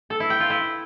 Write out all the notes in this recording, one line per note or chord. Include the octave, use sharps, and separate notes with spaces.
A4
E4
G5
F4
E4